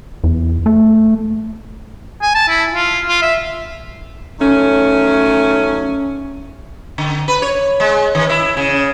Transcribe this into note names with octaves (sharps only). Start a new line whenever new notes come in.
E2
A3
G#5
A5
E4
F4
F4
E5
D#3 F#3 A3 C#4
D3
B4
C#5
G#3
D#3
E4
C#3